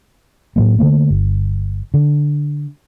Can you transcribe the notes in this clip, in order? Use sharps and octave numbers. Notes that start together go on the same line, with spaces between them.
A2 F#3 A#3
D3 D#3 A3 A#3
G1
D3